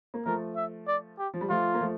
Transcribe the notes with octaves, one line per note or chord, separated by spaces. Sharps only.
A#3
F3 A3 A#4
E5
D5
G4
F3
G3
F3 A3 F4
A#3
F3 A3